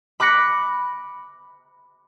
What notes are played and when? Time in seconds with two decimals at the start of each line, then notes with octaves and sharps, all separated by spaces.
0.20 B5 D6 F#6 A#6 C#7